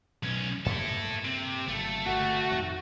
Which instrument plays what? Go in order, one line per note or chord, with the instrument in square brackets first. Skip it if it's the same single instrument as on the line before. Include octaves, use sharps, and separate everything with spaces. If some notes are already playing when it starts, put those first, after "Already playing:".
[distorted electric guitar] B1 C#4
[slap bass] G2 A#3 [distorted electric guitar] E4 A4
[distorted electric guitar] C3
[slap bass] F#1 [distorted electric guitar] A3 A4
[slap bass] G1 C3 [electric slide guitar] F#4
[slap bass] F2 A2 D#3